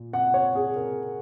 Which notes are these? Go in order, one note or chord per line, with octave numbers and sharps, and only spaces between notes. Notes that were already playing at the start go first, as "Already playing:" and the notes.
Already playing: A#2
F#5
C#5
G#4
A#4